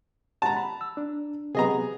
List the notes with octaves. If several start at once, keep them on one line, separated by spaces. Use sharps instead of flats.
F#5 A5 A#5
B5
E6
D4
C3 F#3 B3 G#4 D#5 A#5